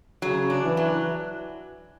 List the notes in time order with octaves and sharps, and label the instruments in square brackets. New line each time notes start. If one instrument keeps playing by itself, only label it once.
[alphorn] C#3 [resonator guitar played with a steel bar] F#3
[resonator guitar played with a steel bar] D4
[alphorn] E3
[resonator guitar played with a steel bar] F#3